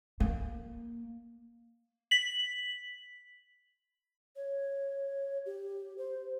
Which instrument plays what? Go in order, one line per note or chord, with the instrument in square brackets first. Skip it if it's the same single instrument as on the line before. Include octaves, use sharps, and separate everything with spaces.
[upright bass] A#3
[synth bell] B6 F#7
[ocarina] C#5
G4
C5